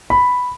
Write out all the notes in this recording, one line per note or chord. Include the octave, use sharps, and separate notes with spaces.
B5